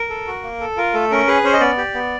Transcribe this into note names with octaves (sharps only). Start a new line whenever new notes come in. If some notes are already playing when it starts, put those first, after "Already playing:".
Already playing: A#4
A4
F#4
A#3
A4
F4 A#4
A3 A4
C#4 A#4
G#4 B4
C#4 C5
D#5
B3 D5
G4
B3